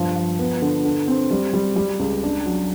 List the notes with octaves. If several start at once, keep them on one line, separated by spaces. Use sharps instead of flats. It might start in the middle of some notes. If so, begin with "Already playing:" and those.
Already playing: G2 F3
F3
B3
D3
D3
C4
G3
G3
G3
C#2
D4
F#3